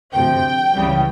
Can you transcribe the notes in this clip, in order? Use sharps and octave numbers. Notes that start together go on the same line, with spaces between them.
D2 C3 F3 G5
C#2 C#3 E3 G3